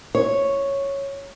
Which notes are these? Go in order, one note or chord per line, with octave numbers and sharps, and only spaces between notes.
C#5